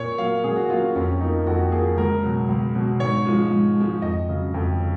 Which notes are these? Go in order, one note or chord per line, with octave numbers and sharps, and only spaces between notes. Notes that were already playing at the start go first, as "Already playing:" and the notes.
Already playing: A#2 C#5
F#3 A#3 F5
A#2 G#4
F#4
F#3 A#3 F4
C#4
F2 C#4
F3 A#3 D#4
F2 F#4
F3 A#3 G#4
C#2 A#4
B2 F#3
C#2
B2 F#3
G#2 C#5
F3 G#3
G#2
F3 G#3
F2 D#5
C#3 F#3
F2
C#3